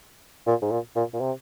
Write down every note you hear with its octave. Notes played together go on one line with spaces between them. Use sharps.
A#2
G#2
A#2
A#2
A#2
C3